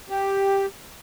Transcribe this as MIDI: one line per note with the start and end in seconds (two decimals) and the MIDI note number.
0.10 0.66 67